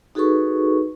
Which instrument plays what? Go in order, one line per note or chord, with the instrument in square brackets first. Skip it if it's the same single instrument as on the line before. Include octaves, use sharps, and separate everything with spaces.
[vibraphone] D#4 F#4 G#4 A4 B4 C#6